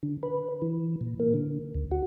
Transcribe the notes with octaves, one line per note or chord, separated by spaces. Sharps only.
D3
B4
E3
A#2
A#3
D3
D2
F#4